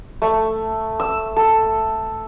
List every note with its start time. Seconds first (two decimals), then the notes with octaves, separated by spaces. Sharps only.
0.22 A3
1.00 E6
1.36 A4